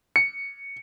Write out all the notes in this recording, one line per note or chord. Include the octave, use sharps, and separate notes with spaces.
C#7